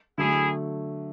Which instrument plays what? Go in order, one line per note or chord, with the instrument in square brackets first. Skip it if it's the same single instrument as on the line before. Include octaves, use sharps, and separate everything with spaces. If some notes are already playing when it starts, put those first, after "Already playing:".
[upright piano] D3 F#3 A3 [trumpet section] E4 G#4